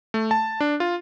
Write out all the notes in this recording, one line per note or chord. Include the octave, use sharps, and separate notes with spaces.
A3
A5
D4
F4